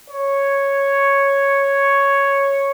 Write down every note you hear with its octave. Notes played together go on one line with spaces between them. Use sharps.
C#5